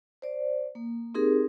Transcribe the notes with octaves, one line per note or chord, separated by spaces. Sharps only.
C5 D5
A#3
C4 D#4 G4 G#4 A#4